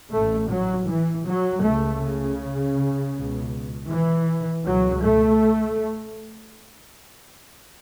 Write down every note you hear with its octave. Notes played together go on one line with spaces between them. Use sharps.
A1 A2 A3
F#3
E3
F#3
C#2 C#3 A3
C#3
C#2 B2
E3
C#2 B2 F#3
A3